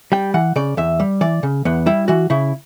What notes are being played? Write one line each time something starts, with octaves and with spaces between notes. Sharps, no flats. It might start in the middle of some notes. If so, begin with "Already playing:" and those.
G3 G5
E3 F#5
C#3 D5
E2 E5
G3
E3 D5
C#3
E2 B3
G3 E4
E3 F#4
C#3 E4